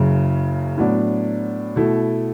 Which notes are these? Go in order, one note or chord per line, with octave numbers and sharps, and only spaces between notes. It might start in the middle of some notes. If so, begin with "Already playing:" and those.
Already playing: F#1 F#2 C#3
A2 F#3 B3 D4
B2 A3 E4